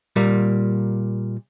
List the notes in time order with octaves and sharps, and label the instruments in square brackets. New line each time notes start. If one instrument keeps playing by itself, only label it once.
[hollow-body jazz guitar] A#2 G3 A#3